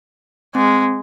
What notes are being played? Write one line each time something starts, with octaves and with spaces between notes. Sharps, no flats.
G#3 C4